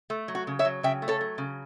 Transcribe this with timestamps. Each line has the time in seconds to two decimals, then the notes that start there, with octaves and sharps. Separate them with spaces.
0.10 A3
0.28 F#3
0.35 F#4
0.47 C#3
0.59 C#5 E5
0.65 F#3
0.83 C#3 E5 G5
1.02 A3
1.08 A4 C#5
1.21 F#3
1.38 C#3